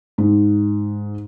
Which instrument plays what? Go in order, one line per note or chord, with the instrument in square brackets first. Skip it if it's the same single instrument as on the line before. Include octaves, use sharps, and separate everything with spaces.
[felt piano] G#2